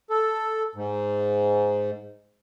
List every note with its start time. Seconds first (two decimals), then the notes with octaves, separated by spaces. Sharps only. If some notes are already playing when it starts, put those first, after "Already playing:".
0.10 A4
0.75 G#2